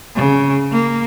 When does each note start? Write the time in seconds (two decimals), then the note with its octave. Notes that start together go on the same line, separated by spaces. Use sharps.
0.16 C#3
0.72 A#3